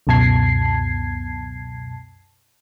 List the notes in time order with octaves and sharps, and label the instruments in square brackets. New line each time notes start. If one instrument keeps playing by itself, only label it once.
[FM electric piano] C#2 F#2 B2 A5 G#6 C7